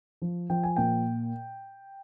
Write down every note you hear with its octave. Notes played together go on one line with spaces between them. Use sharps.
F3
F3 G5
G#5
A#2 G5